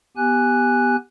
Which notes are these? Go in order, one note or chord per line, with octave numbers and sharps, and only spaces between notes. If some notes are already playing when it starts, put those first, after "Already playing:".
B3 G4 G#5 F#6